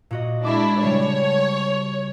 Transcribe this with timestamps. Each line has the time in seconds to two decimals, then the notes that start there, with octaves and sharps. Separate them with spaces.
0.11 A#2 F#4 D#5
0.45 G#3 D4 E4 A5 D6
0.82 C#3 G3 C4 C#5